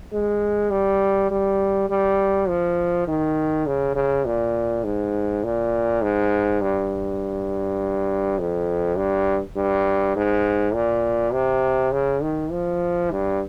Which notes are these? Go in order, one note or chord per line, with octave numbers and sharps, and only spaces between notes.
G#3
G3
G3
G3
F3
D#3
C#3
C#3
A#2
G#2
A#2
G#2
G2
F2
G2
G2
G#2
A#2
C3
C#3
D#3
F3
G2